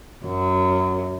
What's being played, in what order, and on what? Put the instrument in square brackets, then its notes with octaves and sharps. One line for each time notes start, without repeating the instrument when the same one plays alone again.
[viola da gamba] F#2